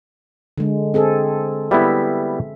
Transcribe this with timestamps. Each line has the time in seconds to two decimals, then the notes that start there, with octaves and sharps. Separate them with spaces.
0.58 D3 G#3
0.94 C4 G#4 A4
1.71 G3 B3 E4 E5